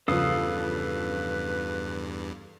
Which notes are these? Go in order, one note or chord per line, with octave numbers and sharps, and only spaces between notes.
E2 G2 C#3 F3 A4 B4 F5 D#6